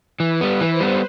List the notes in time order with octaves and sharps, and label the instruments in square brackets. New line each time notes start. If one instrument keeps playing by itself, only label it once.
[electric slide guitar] E3 [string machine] B4
[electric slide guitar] G3 B3
[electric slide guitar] E3 [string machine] C5
[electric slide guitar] G3 B3